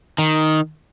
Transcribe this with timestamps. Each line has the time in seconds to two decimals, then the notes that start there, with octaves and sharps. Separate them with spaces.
0.18 D#3